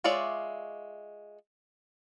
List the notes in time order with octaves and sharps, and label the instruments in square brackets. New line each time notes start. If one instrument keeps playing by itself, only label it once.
[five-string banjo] G#3 F4 C#5 D5 E5